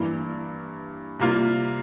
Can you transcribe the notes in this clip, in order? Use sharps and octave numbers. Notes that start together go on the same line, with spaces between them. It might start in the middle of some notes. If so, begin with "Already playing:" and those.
Already playing: G2 E3 A#3 E4
C3 G3 A#3 F4